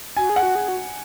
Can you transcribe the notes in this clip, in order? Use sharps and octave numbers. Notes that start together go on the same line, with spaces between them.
F#4 G#5
G#4
F#5
F#4
G#4
F#4